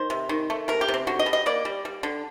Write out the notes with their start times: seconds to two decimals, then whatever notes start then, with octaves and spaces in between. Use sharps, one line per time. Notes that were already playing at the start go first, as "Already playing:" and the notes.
Already playing: D#3 C5
0.10 C3
0.29 D#3
0.50 A3
0.68 C3 A#4
0.81 G4
0.88 C3
0.94 C4
1.07 D3 F#4
1.19 D#5
1.26 G3
1.33 D#5
1.46 A#3 D5
1.65 G3
1.85 G3
2.03 D3